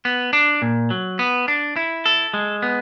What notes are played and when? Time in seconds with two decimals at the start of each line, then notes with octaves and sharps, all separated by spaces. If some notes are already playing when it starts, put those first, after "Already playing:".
0.05 B3
0.33 D4
0.62 A#2
0.90 F#3
1.19 B3
1.48 D4
1.76 E4
2.06 A4
2.34 G#3
2.62 B3